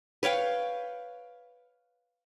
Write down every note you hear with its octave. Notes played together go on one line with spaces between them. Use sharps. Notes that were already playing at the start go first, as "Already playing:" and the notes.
B4 C#5 F5 G5